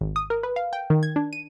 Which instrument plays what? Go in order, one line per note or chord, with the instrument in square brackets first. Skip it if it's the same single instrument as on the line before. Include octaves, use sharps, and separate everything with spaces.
[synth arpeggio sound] G#1
D#6
A#4
B4
F5
G5
D#3
G#6
D4
D#7